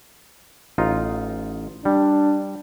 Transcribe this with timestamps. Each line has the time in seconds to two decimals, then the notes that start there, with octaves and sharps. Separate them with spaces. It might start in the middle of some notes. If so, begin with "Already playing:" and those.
0.78 A1 D#4 F4
1.85 G3 D4